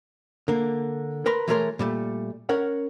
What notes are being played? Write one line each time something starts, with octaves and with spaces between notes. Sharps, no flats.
D3 A#3
A#4 B4 A#5 C6
E3 G#3 A3 A#4 C#5 C6
A#2 G3 A3
C#4 A#4 C#5 F#5